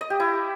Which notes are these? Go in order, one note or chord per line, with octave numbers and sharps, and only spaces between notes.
D#5
G4
E4